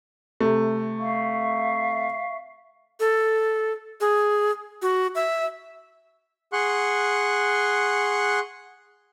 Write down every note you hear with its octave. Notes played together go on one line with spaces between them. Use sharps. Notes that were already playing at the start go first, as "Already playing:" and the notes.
C3 A3
E5 F5 C#6
A4
G#4
F#4
E5
G#4 F#5 C6 C#6 F#6